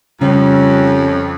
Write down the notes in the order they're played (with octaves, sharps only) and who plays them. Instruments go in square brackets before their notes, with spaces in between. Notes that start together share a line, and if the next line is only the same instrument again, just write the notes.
[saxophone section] F2 [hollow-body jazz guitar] C#3 [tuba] G3 [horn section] C#4